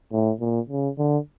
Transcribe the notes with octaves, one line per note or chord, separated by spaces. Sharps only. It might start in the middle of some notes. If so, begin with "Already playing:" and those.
A2
A#2
C#3
D3